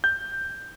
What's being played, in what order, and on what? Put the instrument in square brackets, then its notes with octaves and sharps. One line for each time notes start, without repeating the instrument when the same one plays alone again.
[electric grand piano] G6